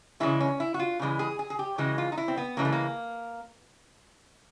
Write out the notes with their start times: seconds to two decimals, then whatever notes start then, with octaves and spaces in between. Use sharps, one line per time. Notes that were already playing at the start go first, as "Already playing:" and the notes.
0.20 C#3 E3 G#3 E4
0.40 C#4
0.60 E4
0.74 F#4
0.79 F4
0.99 C#3 E3 G#3
1.19 G#4
1.39 G#4
1.50 G#4
1.59 G4
1.78 C#3 E3 G#3 F#4
1.98 F4
2.12 D#4
2.17 E4
2.28 C4
2.37 B3
2.57 C#3 E3 G#3 A#3
2.65 A3
2.72 A#3